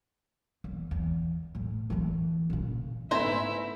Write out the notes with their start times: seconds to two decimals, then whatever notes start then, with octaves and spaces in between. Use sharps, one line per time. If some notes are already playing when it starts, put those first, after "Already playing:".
0.64 E2
0.91 E2
1.55 A2
1.90 E2 E3
2.50 A#2 C#3
3.11 G#2 A3 B3 E4 C5 E5 G#5 A#5